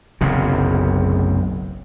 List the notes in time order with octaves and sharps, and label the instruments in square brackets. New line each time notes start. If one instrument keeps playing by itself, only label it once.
[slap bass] F#1 B1 F#2 C3